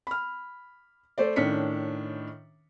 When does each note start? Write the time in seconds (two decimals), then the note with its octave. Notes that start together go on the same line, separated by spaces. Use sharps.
0.07 B5 F6
1.18 A3 C5 D5
1.36 A2 D#3 C#4 D4 B6 C#7